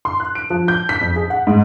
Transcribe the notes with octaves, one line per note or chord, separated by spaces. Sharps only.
C6
F#6
D7
F3
G6
B6
F2
G#4
F#5
G#2